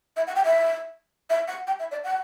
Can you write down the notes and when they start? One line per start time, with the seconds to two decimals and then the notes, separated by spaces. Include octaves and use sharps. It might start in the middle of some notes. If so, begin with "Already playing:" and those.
0.16 E5
0.27 F#5
0.35 G5
0.44 E5
1.30 E5
1.48 F#5
1.67 G5
1.79 E5
1.91 D5
2.04 F#5